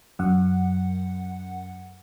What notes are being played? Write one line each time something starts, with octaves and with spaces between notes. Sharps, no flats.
F#2 F#5